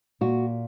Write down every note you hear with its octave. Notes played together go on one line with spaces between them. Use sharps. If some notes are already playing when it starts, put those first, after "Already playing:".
A#2 F#4